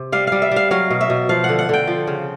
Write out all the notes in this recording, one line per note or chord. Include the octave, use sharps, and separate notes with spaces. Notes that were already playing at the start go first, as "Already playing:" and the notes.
Already playing: C3
G3 F5
G3 F5
E5
G3 F5
F#3 F5
B2
E5
B2
F3 F5
D3 F#5
F#5
D3 G5
F3
C#3